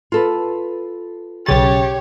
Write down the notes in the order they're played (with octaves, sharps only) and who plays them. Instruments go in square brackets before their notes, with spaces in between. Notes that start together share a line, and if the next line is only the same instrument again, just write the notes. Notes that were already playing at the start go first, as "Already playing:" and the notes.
[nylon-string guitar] F4 A4 B4
[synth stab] B1 C#3 A6 [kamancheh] G4 C#5